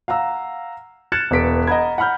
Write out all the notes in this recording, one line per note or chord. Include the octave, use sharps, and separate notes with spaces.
F5 F#5 A#5 E6
F6 F#6 G#6 A6 C#7 E7
E1 B4 B6 D7
D#5 F#5 A#5 B5 G#6
F#5 A#5 B5 F6 G6